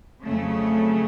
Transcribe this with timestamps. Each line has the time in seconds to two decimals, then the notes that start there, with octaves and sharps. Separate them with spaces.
0.24 F2 C#3 F#3 A3